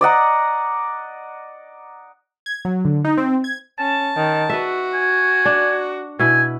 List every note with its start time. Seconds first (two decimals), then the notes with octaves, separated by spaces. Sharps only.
0.01 D5 D#5 F#5 A#5
2.46 G#6
2.65 F#3
2.85 D3
3.05 D#4
3.18 C4
3.44 G#6
3.79 C#4 A5
4.17 D#3
4.50 F#4 B4 E5
4.93 G#5
5.45 D4
6.19 B2 E4 G#5